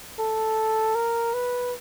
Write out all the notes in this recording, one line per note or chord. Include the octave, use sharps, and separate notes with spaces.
A4
A#4
B4